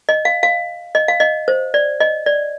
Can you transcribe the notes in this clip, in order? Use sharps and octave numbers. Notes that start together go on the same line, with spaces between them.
D#5
F5
F5
D#5
F5
D#5
C5
D5
D#5
D5